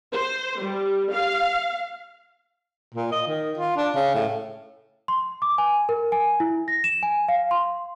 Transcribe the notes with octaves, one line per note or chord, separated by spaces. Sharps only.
C5
G3
F5
A#2
D#5
D#3
F4
D4
C#3
A2
C6
D6
G#5
A#4
G#5
E4
A#6
E7
G#5
F5
C6